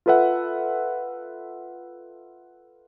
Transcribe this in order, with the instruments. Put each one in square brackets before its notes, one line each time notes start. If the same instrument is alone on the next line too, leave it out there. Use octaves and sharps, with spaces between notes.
[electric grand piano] F4 A4 B4 E5 F#5